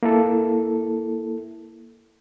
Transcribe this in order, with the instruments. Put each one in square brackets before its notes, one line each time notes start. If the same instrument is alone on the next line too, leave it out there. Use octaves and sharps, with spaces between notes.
[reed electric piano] A#3 E4 A4